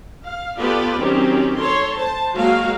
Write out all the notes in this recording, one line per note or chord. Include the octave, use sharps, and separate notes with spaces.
F5
B3 F4 G4 A4 B4 D5
D#3 F#3 C4 C#4 G4
A4 C#5 C6
C5 A5
F#3 G#3 A#3 F#4 F5